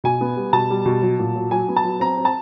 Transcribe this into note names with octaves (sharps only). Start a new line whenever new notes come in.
B2 G#5
B3
G3
B2 A5
G3
B2
F#3
A#2
F#3
F#3 G#5
B3
A5
F#3
C4 A#5
C4
A5